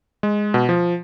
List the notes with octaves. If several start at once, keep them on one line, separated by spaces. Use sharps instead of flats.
G#3
B2
F3